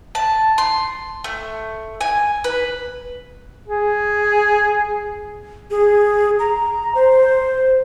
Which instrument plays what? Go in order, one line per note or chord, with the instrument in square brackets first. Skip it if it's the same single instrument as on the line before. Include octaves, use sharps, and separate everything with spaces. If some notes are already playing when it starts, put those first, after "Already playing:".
[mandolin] A5
C6
A3
G#5
B4
[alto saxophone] G#4
[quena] G#4
A#5
C5